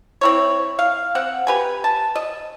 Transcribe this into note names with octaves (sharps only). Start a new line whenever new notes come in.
C4 E4 C#5
F5
C4 F#5
G4 B4 G#5
A5
D#5